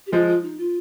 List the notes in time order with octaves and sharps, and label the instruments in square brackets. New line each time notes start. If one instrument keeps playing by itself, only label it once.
[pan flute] G4
[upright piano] F3 G#3 [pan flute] F4
[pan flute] F4
D#4
F4